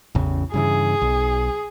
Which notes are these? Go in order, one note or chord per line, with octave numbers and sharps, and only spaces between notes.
A1 E2 C#3
G2 C#3 E3 G#4
B1